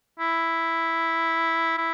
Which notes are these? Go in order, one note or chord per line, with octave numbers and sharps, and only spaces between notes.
E4
E4